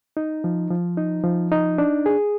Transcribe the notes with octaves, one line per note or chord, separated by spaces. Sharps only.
D#4
F3
F3
D#4
F3
D#4
D4
G#4